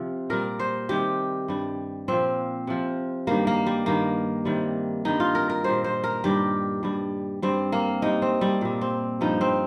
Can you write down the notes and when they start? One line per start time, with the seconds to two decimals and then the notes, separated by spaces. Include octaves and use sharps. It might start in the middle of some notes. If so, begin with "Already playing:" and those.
Already playing: C3 F3
0.30 A#2 G3 A#4
0.59 C5
0.89 C3 D#3 G3 G4
1.48 G2 G3
2.08 A#2 F3 C4
2.67 C3 F3
3.27 G2 D#3 G3 A#3
3.47 A#3
3.66 G3
3.86 G2 D#3 G3 A#3
4.45 C3 D#3 G3
5.05 G2 D#3 G3 D#4
5.20 F4
5.35 A#4
5.50 A#4
5.64 A#2 G3 C5
5.84 C5
6.04 A#4
6.24 G2 D#3 G3 G4
6.83 G2 G3
7.42 G2 G3 C4
7.72 A#3
8.02 C3 G3 D#4
8.22 C4
8.41 G3
8.61 A#2 G3
8.81 C4
9.21 G2 F3 D#4
9.41 C4